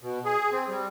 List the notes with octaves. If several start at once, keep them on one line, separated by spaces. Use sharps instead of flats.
B2
G#4
C4
G3